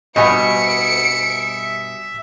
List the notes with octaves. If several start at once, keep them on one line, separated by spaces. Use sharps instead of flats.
G2 B2 G3 D#5 E5 G#5 C#7 D7